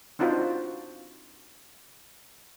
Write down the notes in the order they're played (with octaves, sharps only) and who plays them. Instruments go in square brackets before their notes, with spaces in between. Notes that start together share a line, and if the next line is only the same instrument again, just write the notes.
[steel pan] C4 D4 D#4 F4 F#4 C5